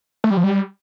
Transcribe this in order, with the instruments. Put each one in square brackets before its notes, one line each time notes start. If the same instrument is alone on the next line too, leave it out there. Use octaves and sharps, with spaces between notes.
[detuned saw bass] A3
G3
F3
G3